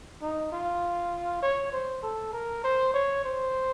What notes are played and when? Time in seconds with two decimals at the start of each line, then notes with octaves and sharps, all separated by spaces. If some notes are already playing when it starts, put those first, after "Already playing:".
0.22 D#4
0.52 F4
1.42 C#5
1.73 C5
2.03 A4
2.33 A#4
2.64 C5
2.94 C#5
3.24 C5